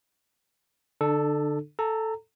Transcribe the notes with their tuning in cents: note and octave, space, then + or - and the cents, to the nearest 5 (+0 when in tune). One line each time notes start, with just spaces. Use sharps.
D3 +0 D4 +35 A4 +0
A4 +0 A#5 -25